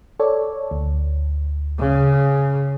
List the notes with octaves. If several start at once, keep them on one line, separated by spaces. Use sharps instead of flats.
A4 C#5 D5
D2
C#3